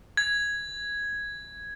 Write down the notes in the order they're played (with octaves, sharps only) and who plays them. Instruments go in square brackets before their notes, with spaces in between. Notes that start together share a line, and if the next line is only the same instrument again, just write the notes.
[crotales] G#6